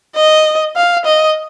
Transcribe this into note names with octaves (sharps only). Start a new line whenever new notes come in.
D#5
F5
D#5